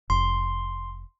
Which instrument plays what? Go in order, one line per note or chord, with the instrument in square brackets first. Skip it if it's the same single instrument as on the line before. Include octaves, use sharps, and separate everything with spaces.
[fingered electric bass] F1 [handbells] C6